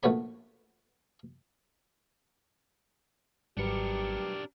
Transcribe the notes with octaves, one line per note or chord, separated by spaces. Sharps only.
A#1 A3 B3 C#5 B5
G#1 F#3 G3 D4 G4 A#4 B4 C#7